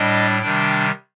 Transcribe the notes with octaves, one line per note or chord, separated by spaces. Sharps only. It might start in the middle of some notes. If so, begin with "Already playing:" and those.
Already playing: A2 G3 D4 D#5
C3 D#3 G3 D4 G5